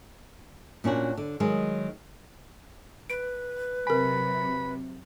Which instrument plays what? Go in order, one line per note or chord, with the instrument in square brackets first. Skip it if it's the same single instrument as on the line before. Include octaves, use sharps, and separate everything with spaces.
[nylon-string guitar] A#2 C#4 D4 F#4
D3
D#3 F#3 G#3
[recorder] B4 [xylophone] D7
[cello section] C3 F#3 [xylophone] A#4 G#5 [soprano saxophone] B5